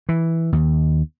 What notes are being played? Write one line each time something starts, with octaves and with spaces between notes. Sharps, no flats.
E3
D#2